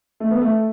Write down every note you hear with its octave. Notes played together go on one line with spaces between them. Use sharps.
A3
B3
A3